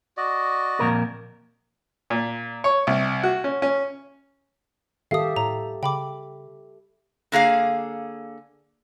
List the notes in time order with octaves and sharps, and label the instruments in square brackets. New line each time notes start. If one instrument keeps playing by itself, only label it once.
[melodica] F#4 D5 D#5
[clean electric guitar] F2 A#2 A#4
[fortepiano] A#2
C#5
C2
F#4
C#4
C#4
[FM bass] D#3 [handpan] G4 A4 E5 [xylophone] F5 D#6
[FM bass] A2 [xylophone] A#5
[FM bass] C#3 [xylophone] G5 B5 D6
[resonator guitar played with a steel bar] D3 A#3 G#4 F5